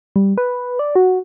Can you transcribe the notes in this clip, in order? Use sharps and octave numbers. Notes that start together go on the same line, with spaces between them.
G3
B4
D5
F#4